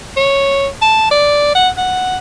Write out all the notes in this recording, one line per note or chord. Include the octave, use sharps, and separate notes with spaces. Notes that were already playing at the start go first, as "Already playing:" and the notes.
C#5
A5
D5
F#5
F#5